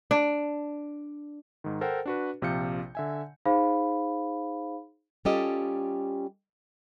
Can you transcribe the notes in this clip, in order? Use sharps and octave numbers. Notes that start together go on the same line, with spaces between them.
D4
G#2 D#3
A4 A#4 C5 F#5 G5
D4 F#4 B4
A#1 C3 F3 F5 G6 C#7
D3 E5 G#5
D#4 G#4 C5 F5 B5
G3 C#4 F4 G4 A4 D#5